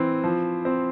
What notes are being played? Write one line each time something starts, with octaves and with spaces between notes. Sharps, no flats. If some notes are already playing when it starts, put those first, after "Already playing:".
Already playing: E3 C4
F3
C4